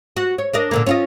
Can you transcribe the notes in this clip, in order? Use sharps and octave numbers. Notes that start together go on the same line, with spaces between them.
F#4
C#5
D4 A#4 D#5
A#2 D3 A#3
C#4 F4 D#5